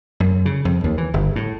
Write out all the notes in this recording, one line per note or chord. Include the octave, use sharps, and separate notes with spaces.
F#2
C#3
F2
D#2
E3
G1
A2